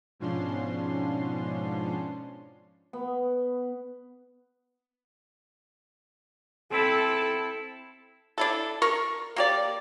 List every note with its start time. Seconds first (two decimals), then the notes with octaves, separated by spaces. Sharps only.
0.20 G#2 B2 F3 C#4 D4 C6
2.93 B3
6.72 C4 E4 A4
8.38 D4 E4 A4
8.82 A#4 C#6
9.36 A#3 G4 D5